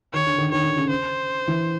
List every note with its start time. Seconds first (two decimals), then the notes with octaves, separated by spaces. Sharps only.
0.13 D#3 C#5
0.27 D3
0.38 D#3
0.52 D#3 C#5
0.64 D3
0.77 C#3
0.90 C5
1.48 E3